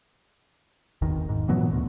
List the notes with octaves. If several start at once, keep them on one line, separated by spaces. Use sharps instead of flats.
G#1 E2 D#3
G#2
A#2 E3 F#3 B3
D2